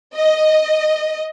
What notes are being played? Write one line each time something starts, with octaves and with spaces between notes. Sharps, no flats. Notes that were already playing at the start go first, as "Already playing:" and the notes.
D#5